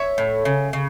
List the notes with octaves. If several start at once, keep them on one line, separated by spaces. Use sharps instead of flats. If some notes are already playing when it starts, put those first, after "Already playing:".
Already playing: C#5 E5
A2
C#3
C#3